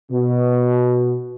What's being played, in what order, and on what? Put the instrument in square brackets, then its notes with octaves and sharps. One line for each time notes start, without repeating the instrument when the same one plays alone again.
[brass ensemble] B2